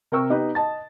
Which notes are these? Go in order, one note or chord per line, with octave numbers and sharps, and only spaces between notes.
C3 A#4 G5 C#6 E6
B3 D#4 G4 B4
D#5 A5 A6